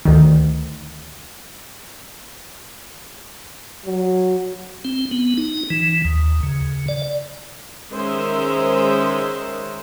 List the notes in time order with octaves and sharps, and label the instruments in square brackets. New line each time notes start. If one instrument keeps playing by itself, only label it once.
[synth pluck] D2 D#3
[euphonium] F#3
[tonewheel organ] C4
B3
D#4
E3
D#2
C#3
D5
[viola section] D#3 G#3 C#4 A#4 C5 E5